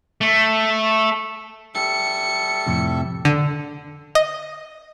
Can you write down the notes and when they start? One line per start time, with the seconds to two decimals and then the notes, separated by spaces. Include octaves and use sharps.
0.21 A3
1.75 G3 A4 E5 C#7
2.66 F2 A2 C3
3.25 D3
4.15 D#5